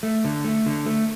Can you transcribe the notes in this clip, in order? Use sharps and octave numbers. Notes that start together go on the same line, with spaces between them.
A3
D3
A3
D3
A3